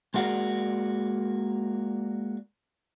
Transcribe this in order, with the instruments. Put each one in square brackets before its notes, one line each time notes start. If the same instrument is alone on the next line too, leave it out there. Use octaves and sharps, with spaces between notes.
[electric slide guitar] G#3 A#3 F#4 G#4 A#4 D5